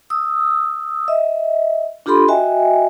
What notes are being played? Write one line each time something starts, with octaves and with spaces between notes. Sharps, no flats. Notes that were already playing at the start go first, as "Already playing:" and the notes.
D#6 E6
D#5 E5
D4 F4 G4 A4 B5 C6
F#4 D#5 E5 G5 G#5